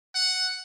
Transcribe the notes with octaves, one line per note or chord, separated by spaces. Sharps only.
F#5